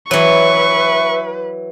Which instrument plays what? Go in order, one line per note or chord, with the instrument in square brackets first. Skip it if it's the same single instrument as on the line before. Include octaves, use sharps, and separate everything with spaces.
[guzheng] E3 F#3 [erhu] B4 [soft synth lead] E5 [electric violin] C#6